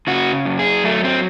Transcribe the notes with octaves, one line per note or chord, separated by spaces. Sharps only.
C#3 F#4
F#2
G#4
F#3 A3
C4